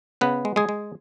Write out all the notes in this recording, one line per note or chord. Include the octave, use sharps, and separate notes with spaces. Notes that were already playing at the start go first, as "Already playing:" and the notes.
C#3 B3 B4
G#3
G#3 G#4
G#3